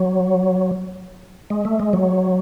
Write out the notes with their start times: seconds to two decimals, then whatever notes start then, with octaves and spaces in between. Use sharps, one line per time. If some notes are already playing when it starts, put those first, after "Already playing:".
Already playing: F#3
1.50 G#3
1.65 A3
1.80 G#3
1.93 F#3